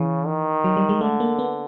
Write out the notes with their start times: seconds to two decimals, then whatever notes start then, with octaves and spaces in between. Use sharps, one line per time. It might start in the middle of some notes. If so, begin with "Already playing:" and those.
Already playing: C#3 E3
0.27 D#3
0.64 F#3
0.76 G3
0.89 G#3
1.01 D3 A3
1.20 A#3
1.39 B3